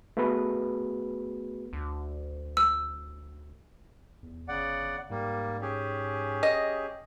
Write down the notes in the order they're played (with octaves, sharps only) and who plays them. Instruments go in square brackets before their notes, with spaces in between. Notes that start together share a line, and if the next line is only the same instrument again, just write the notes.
[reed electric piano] A3 B3 F#4 G#4 B4
[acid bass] D2
[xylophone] E6
[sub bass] E2
[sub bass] G1 [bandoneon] C#3 D5 F#5
[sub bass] G#2 [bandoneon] G3 A#3
[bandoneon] C#4 G4 G#4
[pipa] D#5